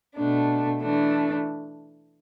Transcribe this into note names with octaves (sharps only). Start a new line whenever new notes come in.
B2 A3 D4
E3 A3 D4